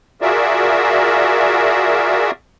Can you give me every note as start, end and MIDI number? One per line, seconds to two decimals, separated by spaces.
0.21 2.31 65
0.21 2.31 66
0.21 2.31 68
0.21 2.31 70
0.21 2.31 74
0.21 2.31 76